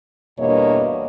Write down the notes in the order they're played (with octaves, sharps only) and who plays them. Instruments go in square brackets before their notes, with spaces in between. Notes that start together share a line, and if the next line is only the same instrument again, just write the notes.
[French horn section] E2 G2 B2 A#3 C#5 D#5